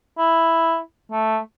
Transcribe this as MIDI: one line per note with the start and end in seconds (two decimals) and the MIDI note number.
0.18 0.79 64
1.12 1.39 57